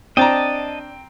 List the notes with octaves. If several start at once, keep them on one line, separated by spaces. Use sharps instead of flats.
C4 D4 D#5 G5 A5 A#5